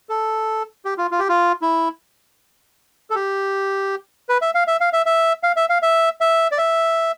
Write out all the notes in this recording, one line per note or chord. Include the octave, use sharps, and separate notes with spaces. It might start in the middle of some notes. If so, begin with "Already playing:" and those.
A4
G4
F4
F4
G4
F4
E4
A4
G4
B4
E5
F5
E5
F5
E5
E5
F5
E5
F5
E5
E5
D5
E5